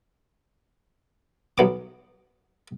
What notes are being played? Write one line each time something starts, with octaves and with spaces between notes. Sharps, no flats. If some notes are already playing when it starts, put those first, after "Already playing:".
B1 B3 D6